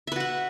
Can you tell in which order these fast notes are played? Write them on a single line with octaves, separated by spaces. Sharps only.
E5 B4 F#4 F#5